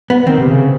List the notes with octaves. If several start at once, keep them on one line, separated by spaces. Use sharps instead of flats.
B3
D#3 C4
C3
C#3